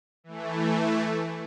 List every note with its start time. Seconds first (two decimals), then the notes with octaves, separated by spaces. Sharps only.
0.24 E3 A3